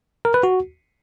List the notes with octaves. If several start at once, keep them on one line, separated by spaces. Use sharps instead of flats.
A#4
B4
F#4